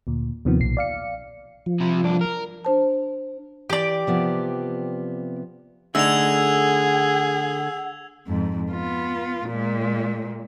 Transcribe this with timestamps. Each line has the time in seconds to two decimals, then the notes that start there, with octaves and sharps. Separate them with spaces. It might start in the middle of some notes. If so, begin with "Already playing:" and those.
0.07 D2 A#2
0.45 D#2 C3 D#3 F3 B3
0.59 B1 A#2 C7
0.77 D5 F5 C#7
1.66 F3
1.80 C3 E4
2.03 C2 D4
2.21 A#4
2.65 D4 C5 A5
3.70 E3 G4 D5
4.07 C3 F3 B3
5.95 D3 A3 D#4 G#4 F#5 E6 G#6 F7
8.27 F2 G#2
8.72 B3 F4
9.47 A#2 G#3